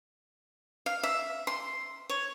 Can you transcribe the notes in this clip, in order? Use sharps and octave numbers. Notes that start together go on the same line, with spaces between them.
F5
E5
C6
C#5